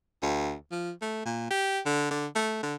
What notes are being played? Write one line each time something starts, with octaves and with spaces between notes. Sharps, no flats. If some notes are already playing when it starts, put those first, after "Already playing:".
D2
F3
A3
A#2
G4
D3
D3
A3
D3